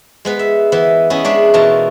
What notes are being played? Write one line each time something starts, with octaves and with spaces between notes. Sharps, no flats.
G#3 B3 B4
E5
E3 B3 E5
B3 C#4 E4 G#4 D#5
G#3 D4 C#5 E5
B2 E3 F4 A#4 A5